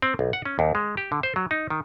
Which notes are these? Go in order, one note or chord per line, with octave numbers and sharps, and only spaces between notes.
C4
B1
F#5
C#4
D#2
G#3
G4
D3
C5
F#3
D#4
D#3